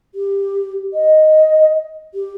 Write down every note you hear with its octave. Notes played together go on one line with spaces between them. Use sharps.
G4
D#5
G4